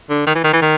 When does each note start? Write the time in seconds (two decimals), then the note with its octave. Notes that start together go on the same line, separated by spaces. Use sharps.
0.10 D3
0.27 D#3
0.35 E3
0.44 D#3
0.53 E3
0.62 D#3